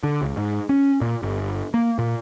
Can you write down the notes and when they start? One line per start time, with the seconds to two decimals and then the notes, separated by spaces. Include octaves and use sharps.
0.03 D3
0.22 C#2
0.37 G#2
0.69 C#4
1.01 A#2
1.22 G1
1.74 A#3
1.98 A#2